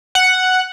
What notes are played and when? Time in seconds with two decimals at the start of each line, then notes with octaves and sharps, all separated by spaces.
0.15 F#5